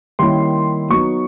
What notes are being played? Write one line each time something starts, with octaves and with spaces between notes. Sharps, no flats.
D#3 G3 A#3 C#4 E4 C6
F#3 B3 D#4 C#6